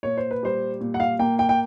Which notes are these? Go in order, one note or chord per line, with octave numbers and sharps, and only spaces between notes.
A#2 C#5
C5
B4
G3 C5
A#2
F#5
F5
A#3 G5
G5
G5